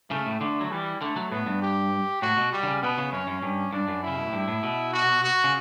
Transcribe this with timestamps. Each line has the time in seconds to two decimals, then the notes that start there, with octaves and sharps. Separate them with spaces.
0.11 C#3 A3
0.26 A2
0.40 D3 A3
0.61 F#3
0.71 E3 G3
1.01 D3 A3
1.16 F#3
1.31 A2 B3
1.46 G2
1.62 G4
2.22 A2 F#4
2.37 B2
2.53 G3
2.63 D3
2.67 C#3
2.83 B2 B3
2.98 C#3
3.12 F#2 C#4
3.27 F#2
3.42 G2 C#4
3.73 G2 D4
3.88 F#2
4.03 C#3 E4
4.15 B2
4.25 A2
4.33 G2
4.48 A2
4.63 B2
4.93 F#4
5.24 F#4
5.44 C#3